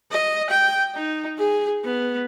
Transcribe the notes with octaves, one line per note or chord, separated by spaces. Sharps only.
D#5
G5
D#4
G#4
B3